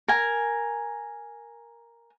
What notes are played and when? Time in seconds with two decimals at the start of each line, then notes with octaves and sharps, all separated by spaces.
0.08 A#4 G#5